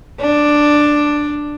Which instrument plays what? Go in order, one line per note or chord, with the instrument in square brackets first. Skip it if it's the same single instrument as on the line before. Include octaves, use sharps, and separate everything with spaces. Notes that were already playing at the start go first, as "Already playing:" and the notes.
[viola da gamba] D4